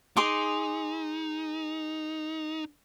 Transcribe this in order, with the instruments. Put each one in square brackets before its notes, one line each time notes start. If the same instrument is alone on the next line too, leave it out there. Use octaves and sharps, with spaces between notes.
[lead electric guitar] D#4 [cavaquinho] G#4 C6 D6